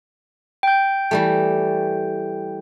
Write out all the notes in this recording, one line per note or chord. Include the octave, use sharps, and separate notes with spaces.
G5 G6
E3 G3 A3